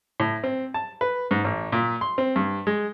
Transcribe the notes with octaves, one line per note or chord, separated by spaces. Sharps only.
A2
C4
A5
B4
G#2
A1
A#2
C6
C4
G2
G#3